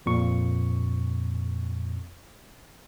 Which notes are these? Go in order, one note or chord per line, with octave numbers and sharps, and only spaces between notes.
F2 A#2 C#6